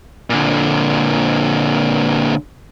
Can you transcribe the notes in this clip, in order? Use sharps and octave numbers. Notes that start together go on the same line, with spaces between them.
A#2 D3